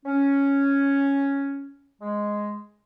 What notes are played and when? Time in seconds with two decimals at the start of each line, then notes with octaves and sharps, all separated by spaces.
0.06 C#4
2.02 G#3